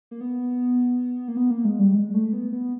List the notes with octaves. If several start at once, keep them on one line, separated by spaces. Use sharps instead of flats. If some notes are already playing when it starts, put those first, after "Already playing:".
A#3
B3
A#3
B3
A#3
G#3
G3
G#3
A3
B3
B3